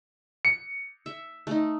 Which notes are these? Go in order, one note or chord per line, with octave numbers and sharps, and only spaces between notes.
C#7
E5
A3 D#4